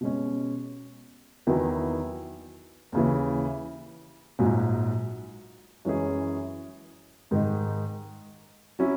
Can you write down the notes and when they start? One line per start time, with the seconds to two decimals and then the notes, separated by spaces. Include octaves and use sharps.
0.01 B2 G#3 C#4
1.47 E2 D#3 F#3 B3 E4
2.92 D#2 C#3 E3
4.39 A#1 G#2 F#3
5.85 F#2 E3 G#3 C#4 G#4
7.31 G#2 D#3 G#3 D#4
8.79 F#3 C#4 E4